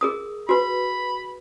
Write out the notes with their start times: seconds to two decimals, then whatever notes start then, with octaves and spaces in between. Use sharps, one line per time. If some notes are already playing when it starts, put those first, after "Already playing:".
0.01 G#4 A#4 D#6
0.49 F#4 B4 B5